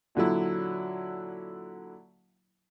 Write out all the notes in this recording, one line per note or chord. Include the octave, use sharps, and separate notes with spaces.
A#2 D3 F#3 E4